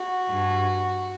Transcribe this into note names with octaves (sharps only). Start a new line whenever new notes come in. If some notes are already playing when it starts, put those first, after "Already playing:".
Already playing: F#4
G2